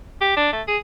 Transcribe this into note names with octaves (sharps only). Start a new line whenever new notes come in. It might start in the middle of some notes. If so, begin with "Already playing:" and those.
G4
D4
A3
G#4